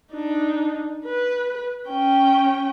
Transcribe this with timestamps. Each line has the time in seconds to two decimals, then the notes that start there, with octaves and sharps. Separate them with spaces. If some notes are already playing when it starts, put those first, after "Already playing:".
0.12 D4 D#4
1.05 B4
1.90 C#4 G5